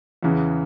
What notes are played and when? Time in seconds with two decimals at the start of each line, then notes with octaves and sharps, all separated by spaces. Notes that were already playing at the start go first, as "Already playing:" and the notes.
0.23 E2 C#3 E3